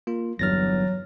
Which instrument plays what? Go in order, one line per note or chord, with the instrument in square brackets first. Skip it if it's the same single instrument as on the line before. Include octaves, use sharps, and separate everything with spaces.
[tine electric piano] A#3 F4
[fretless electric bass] G1 E2 G2 [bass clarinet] F#3 [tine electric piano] F6 A6 A#6